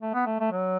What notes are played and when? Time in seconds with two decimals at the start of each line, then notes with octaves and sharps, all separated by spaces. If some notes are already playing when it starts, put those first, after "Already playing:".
0.01 A3
0.14 B3
0.26 A3
0.40 A3
0.52 F#3